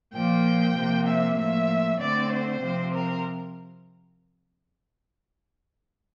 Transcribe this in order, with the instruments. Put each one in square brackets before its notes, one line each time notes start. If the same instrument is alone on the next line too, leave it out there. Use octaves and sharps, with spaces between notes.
[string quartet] A#2 F3 A#3 G5
C3 F3 A#3
E5
A2 F3 A#3 E5
D3 A3 C4 D5
C5
C3 F3 C4
A#4